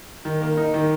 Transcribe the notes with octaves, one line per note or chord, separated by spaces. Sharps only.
D#3
A#3
D#4
D#3